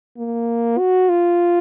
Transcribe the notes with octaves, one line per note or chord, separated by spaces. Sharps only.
A#3
F#4
F4